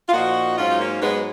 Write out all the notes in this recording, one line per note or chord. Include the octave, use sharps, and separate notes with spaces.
F4
A#2 F3 D#4 F#4
G#2 F#3 C#4 F4
D#4
A#3 C#4
G#2 F#3 G#3 B3